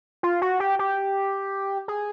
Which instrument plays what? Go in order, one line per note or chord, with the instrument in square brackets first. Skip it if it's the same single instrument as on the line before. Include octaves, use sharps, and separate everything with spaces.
[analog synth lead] F4
F#4
G4
G4
G#4